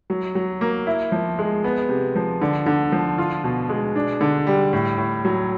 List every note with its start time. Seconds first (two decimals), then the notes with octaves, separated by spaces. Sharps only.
0.10 F#3
0.35 F#3
0.61 A#3
0.87 E4
1.12 F3
1.39 G#3
1.64 B3
1.89 C3
2.16 F3
2.41 D3
2.66 D3
2.92 F3
3.18 F4
3.44 B2
3.69 G#3
3.96 D4
4.21 D3
4.47 G3
4.73 A2
4.98 A2
5.25 F#3